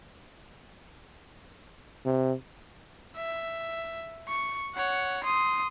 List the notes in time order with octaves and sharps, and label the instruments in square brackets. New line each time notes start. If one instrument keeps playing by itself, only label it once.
[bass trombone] C3
[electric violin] E5
C#6
C#5 F#5
C6 D#6